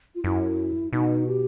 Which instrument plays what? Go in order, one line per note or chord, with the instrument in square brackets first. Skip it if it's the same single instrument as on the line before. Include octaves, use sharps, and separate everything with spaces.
[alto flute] F4
[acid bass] F#2 [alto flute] E4
[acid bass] B2 [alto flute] D#4
[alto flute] G4